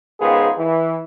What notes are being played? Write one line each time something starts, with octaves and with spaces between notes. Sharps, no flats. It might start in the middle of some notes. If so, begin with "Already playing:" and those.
C#2 G#2 D#3 B3 F4 G#4
E3